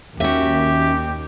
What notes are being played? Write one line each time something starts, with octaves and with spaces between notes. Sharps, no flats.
D#2 C#4 F#4 G4 E5